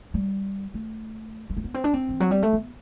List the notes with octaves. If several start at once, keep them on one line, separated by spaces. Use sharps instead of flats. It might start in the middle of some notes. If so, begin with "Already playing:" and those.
G3
A3
G3
A3
B3
C4
D4
C4
E3
F#3
G3
A3
B3